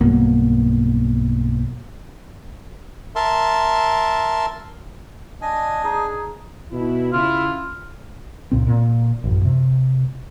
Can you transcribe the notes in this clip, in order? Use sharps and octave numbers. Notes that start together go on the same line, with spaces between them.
B1 G2 A#3 B3
A#4 E5 A5 C6
D4 D#5 G#5
D#4 G#4
B2 E4
C#3 E4 F4
C#2 A#2 C4
A#2
A1 F#2
C3